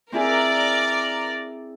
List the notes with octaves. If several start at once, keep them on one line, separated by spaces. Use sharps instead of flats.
C4 E4 G#4 A#4 D5